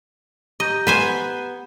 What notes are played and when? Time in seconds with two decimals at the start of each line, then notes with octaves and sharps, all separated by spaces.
0.60 G4 D#5 A#5 G6
0.87 B3 B4 C5 G#5